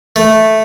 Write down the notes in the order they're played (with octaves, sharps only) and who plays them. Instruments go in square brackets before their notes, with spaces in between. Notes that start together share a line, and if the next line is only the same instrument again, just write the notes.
[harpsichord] A3